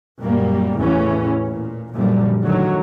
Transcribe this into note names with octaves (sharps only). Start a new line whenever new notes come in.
F#2 A#2 G3 A#3
A1 E2 A2 C#3 E3 C#4
A#2
F#2 A#2 D3 F3 G3
A2 D3 D#3 F#3